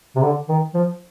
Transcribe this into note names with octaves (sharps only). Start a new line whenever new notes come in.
C3
D3
D#3
F3